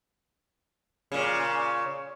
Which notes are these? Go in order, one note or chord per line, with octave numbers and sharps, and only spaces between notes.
A#2 C#3